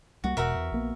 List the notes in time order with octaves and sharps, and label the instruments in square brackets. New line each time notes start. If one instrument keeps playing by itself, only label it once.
[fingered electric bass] C2 G3 A#3 [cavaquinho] F#4
[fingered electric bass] E1 B2 [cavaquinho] F#4 A#4 E5
[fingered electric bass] E2
A#1 A#3 B3